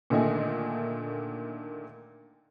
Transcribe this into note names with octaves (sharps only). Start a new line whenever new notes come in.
A#2 D3 D#3 A3 D#5 G#5